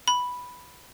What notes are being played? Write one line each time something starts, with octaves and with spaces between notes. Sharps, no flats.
B5